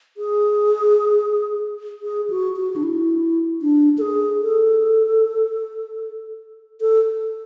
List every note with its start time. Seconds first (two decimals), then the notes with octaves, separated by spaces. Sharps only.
0.17 G#4
2.03 G#4
2.30 F#4
2.57 F#4
2.76 D4
2.83 E4
3.62 D4
3.98 A4
4.01 G#4
4.42 A4
6.81 A4